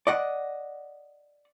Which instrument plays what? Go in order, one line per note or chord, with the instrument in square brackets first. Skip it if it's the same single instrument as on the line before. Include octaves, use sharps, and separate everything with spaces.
[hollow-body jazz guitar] D5 D#5 F#5